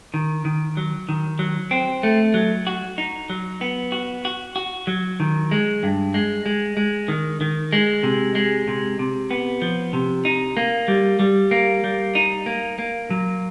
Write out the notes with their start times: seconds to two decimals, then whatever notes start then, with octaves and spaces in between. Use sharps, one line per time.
0.14 D#3
0.45 D#3
0.77 F#3
1.09 D#3
1.39 F#3
1.71 C4
2.03 A3
2.34 F#3
2.67 F#4
2.98 D#4
3.30 F#3
3.61 B3
3.92 F#4
4.25 F#4
4.56 F#4
4.87 F#3
5.20 D#3
5.51 G#3
5.83 G2
6.14 G#3
6.46 G#3
6.77 G#3
7.08 D#3
7.41 D#3
7.73 G#3
8.03 C3
8.35 G#3
8.68 C3
8.99 C3
9.31 B3
9.62 F3
9.93 C3
10.25 D#4
10.57 A#3
10.88 G3
11.19 G3
11.51 A#3
11.84 G3
12.15 D#4
12.46 A#3
12.78 A#3
13.10 F#3